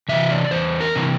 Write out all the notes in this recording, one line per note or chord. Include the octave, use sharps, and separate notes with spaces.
C3 E3 E5
D5
E2 C5
A#4
C3 E3